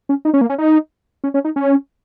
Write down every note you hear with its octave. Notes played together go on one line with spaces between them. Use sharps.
C#4
D#4
C#4
A#3
C#4
D#4
C#4
C#4
D#4
C#4